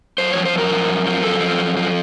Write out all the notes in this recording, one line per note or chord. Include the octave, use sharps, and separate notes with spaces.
F#2 C5
F3 C#5
C5
F#2
A#4
F3
F#2
F3
F#2 A4
F3
F#2
F3